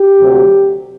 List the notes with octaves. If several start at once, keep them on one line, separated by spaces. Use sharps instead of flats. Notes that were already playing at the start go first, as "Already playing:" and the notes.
Already playing: G4
D2 C3 F#3